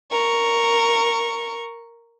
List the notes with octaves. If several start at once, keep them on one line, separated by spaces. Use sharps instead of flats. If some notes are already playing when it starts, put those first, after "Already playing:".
A#4 C#6